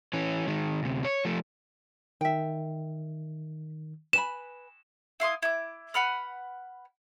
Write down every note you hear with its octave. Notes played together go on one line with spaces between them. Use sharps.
E3 C#4
D#3 G#3
D2 C3
C#5
F3 A3
D#3 E5 G5
B4 G#5 B5 E7
E4 F5 C6 D#6
E4 D6
B4 F#5 B5 F6